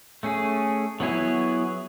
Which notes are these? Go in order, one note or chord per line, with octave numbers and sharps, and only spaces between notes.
A3 C#4 G#4
F#3 B3 E4 G#4 C#5